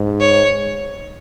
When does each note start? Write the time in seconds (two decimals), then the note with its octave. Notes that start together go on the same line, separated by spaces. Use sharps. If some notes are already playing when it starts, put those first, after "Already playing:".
Already playing: G#2
0.20 C#5